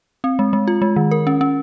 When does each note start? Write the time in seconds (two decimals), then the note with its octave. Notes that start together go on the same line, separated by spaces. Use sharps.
0.24 C4
0.39 G#3
0.53 G#3
0.68 F4
0.82 G#3
0.96 D#3
1.11 A#4
1.27 C#4
1.41 C#4